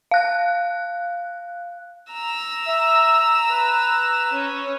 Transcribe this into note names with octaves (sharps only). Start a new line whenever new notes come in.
F5 F#6
A#5 E6
E5
B4
C#4